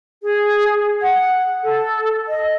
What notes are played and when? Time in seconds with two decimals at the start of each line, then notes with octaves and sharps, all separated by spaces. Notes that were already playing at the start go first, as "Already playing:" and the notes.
0.23 G#4
1.01 F#5
1.63 A4
2.28 D#5